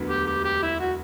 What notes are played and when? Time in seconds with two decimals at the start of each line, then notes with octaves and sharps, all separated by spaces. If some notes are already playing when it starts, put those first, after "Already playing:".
Already playing: E1 D2 D3 F#3 B3
0.10 G4
0.27 G4
0.45 G4
0.63 E4
0.80 F#4